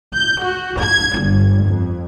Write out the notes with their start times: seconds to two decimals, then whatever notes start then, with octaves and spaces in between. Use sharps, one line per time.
0.13 G6
0.42 F#4
0.82 G#6
1.20 G1
1.66 F2